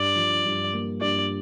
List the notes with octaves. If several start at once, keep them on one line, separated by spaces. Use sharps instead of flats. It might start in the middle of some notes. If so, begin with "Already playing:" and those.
Already playing: G2 D5
F3
G2
A#3
G2 D5